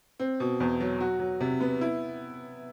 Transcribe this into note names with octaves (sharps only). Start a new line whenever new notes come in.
C4
B2
E2
F#3
F#4
F#3
C3
B3
E4